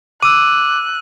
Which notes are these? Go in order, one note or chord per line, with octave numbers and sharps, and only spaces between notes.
D6 E6 F#6 D#7